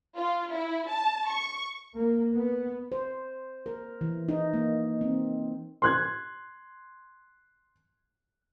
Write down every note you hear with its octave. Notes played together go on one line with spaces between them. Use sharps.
F4
E4
A5
C#6
A#3
B3
C5
A#4
E3
D#4
A#3
C4
C6 F#6 G#6